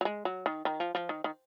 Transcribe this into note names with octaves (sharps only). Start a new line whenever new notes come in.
F#3
G#3
F#3
D#3
D#3
F3
F3
D#3
D#3